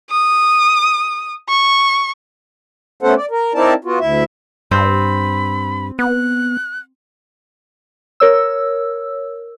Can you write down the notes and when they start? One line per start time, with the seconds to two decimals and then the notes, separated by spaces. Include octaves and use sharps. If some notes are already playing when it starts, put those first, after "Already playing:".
0.11 D#6
1.49 C#6
3.03 A3 B3 C#4 A4 C5 F#5
3.16 D5
3.31 A#4
3.54 C4 D#4 E4 A#4 D5 A5
3.84 B3 F4 F#4
4.00 D2 E4 E5
4.71 G2 C4 B5
5.99 B3 F#6
8.20 A#4 C#5 E6